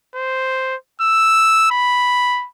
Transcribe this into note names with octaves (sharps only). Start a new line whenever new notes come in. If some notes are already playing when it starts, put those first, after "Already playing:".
C5
E6
B5